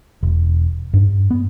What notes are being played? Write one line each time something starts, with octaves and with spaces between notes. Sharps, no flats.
E1
G2
B3